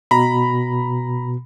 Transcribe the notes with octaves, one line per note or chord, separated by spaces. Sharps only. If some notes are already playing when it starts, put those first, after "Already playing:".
B2 A#5 B5